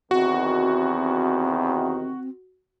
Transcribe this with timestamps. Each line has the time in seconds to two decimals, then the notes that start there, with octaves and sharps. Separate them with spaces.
0.11 E2 C3 D#3 C4 F#4